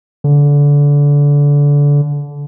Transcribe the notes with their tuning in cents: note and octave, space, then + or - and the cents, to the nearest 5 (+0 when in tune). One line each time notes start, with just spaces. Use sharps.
D3 -25